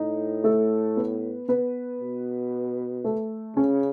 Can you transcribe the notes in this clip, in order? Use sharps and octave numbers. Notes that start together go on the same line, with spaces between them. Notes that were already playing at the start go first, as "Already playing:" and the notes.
Already playing: A2 D#4
A3 A4
B3 B4
B3 B4
B2
A3 A4
C#3 C#4